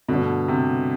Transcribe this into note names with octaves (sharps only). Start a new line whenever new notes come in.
G2 B2 D3 A3
C3